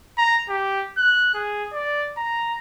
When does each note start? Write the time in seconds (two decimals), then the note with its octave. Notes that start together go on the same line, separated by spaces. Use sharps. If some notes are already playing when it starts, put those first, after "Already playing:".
0.18 A#5
0.49 G4
0.98 F#6
1.34 G#4
1.73 D5
2.17 A#5